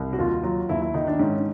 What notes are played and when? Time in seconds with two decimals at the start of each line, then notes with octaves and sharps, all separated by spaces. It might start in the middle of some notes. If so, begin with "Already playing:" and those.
Already playing: C2
0.13 F#4
0.19 D#2 F4
0.43 F#3 F4
0.69 D#2 E4
0.82 E4
0.94 D#3 D#4
1.07 D4
1.19 G#2 C#4